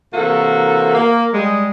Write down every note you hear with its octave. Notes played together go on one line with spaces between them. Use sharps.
C3 E3 A#3 F#4 A4 A#4
A#3
G3 G#3